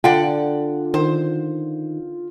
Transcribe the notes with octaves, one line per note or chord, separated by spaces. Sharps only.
D3 F4 D5 F#5 G5
D#3 C5